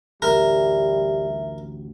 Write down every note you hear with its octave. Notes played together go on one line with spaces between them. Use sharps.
A1 D2 G3 A#4 E5